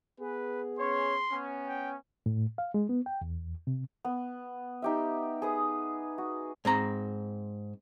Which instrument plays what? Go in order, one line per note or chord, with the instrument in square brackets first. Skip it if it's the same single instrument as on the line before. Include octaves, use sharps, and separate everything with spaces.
[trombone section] B3 G#4 [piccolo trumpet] B4
[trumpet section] C#4 C#5 [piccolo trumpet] C6
[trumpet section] B3 C#4
[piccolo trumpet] G5
[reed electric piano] A2
F5
G#3
B3
G5
E2
C3
[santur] B3
D#4 G4 E5
G#4 B4 D#6
F#4
[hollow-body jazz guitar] G#2 C4 A#5